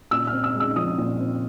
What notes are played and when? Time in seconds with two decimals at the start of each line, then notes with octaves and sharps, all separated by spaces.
0.11 A#2 E6
0.27 F6
0.33 C4
0.44 E6
0.55 G#3
0.60 E6
0.76 F3 D#6
0.98 A#2
1.20 C4